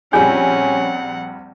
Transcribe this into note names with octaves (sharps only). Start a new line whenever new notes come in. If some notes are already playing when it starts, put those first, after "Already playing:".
A#1 G3 C4 C#4 G#4 F#5 G#5 G6